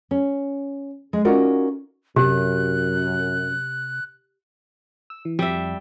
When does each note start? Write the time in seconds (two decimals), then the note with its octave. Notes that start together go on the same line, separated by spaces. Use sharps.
0.11 C#4
1.13 G#3
1.25 C#4 D#4 F4 F#4 A#4 D5
2.16 F#2 C3 G4 F#6
5.10 E6
5.25 E3
5.39 F2 G3 E5